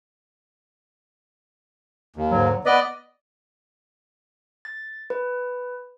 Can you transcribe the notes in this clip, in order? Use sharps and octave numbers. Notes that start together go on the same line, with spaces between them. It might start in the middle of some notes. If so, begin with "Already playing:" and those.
D#2
G#2 D3 F#3
B3 B4 D5 D#5
A6
B4